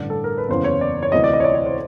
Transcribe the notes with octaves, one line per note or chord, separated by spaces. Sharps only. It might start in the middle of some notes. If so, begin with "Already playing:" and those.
Already playing: A1 G2 D3 D5
A4
A#4
B4
F#1 E2 C#3 E3 C5
C#5
D5
C#5
D2 C3 E3 D#5
D5
D#5
C#5
D5
C#5
C5